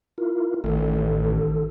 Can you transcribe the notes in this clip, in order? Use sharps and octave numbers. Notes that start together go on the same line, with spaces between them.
E4 F4 A#4
A1 D#3 A4